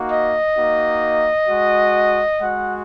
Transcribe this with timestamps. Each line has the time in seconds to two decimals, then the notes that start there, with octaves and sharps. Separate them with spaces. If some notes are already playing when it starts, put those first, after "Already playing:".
Already playing: A#3 D#4 F#4
0.11 D#5
0.57 A#3 D#4 F#4
1.49 G#3 F#4
2.40 G#3 F#4 F#5